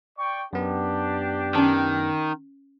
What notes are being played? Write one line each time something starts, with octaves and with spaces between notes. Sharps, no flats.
D5 G5 C#6
F#2 B3 D4 G4
D#3 C#4 A5